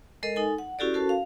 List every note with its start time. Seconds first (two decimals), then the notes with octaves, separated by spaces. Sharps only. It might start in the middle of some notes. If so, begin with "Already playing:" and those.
0.23 G#3 A4 A#4 D#5
0.36 D#4 A4 G#5
0.58 F#5
0.79 C#4 E4 F#4 G4 A4 D5
0.94 C#4 F#4 A4 A#4 C5 A5
1.09 F5